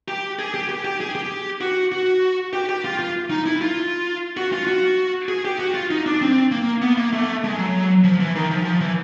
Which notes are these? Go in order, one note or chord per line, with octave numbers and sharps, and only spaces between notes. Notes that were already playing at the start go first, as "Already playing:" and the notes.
G4
G#4
G4
G4
G4
G#4
G4
F#4
F#4
G4
G4
F4
F4
D#4
E4
F4
F#4
F4
F#4
G#4
G4
F#4
F4
D#4
D4
C4
A#3
B3
A#3
A3
G#3
F#3
F3
E3
D#3
F3
F3
E3